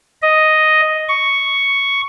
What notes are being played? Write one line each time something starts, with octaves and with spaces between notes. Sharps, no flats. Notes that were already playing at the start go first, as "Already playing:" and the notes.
D#5
C#6